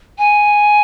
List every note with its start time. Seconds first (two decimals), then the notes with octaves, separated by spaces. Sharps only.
0.18 G#5